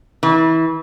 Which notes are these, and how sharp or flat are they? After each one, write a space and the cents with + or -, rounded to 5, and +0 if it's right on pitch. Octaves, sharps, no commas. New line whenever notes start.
E3 -25